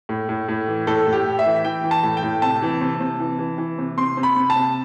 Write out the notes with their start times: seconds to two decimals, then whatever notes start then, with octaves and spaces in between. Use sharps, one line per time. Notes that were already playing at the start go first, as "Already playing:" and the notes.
0.09 A2
0.29 A2
0.48 A2
0.68 E3
0.87 A2 A4
1.07 A2
1.13 G4
1.25 A2
1.39 E5
1.46 E3
1.65 E3 G5
1.84 E3
1.91 A5
2.03 A2
2.17 G5
2.23 A2
2.42 C3 A5
2.62 E3
2.81 C3
3.01 C3
3.20 E3
3.39 E3
3.58 E3
3.78 C3
3.98 C3 C6
4.17 C3
4.23 B5
4.36 C3
4.50 A5
4.56 C3